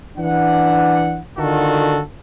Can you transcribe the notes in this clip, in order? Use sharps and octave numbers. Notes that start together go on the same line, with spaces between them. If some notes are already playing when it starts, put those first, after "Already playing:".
E3 D4 F#5
D3 D#3 F4 F#4 A4